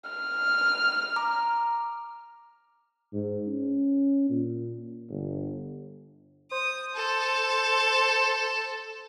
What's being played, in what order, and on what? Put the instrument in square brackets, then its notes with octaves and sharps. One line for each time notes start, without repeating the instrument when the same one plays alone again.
[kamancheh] F6
[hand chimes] A#5 D6
[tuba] G#2
C#4
A#2
G1
[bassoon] C5 [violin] D#6
[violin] A4